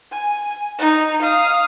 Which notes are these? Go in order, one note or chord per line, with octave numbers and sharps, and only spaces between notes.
G#5
D#4
F5 D#6